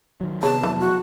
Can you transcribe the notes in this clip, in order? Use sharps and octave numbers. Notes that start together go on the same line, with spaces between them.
D#3 F#3
C3 B3 G#4 C#5 A5
F1 E3 F#3 B3
F#4